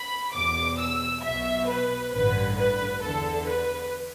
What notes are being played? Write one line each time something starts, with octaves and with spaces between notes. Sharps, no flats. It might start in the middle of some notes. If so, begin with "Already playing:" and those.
Already playing: B5
E2 B2 D6
E6
B1 B2 E5
B4
A1 G2 D3 B4
B4
E2 D3 A4
B4